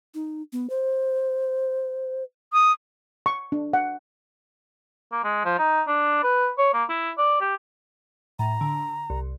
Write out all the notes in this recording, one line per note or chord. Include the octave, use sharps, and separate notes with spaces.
D#4
B3
C5
D#6
C#6
D4
F#5
A#3
G#3
F3
D#4
D4
B4
C#5
A#3
E4
D5
G4
A2 A#5
D3
C2